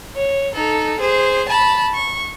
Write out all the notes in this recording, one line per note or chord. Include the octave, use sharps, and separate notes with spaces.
C#5
D#4 A4
G#4 C5
A5 B5
C#6